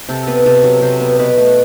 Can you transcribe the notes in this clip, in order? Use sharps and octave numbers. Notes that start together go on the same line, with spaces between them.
C3 A4
B3
C3 A4
F#3
C3 C5
B3
B2 B4
A3